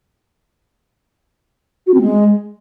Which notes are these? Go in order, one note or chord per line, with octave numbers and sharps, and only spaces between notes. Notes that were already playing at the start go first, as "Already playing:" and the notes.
F#4
C4
G#3